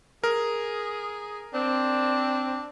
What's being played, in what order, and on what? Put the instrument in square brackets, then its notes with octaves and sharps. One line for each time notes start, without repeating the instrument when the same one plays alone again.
[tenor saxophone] G#4 [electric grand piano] A#4
[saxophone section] C4 [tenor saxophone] D4